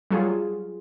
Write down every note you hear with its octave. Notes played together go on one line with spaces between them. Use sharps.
F#3 G3 F4 G#4